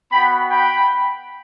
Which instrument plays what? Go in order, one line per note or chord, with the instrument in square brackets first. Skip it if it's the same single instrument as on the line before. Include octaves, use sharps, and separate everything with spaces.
[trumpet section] B3 F#4 G5 B5
G5 B5